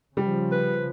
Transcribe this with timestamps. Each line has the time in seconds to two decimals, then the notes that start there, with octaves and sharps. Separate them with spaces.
0.17 C#3 F3 G3
0.52 B4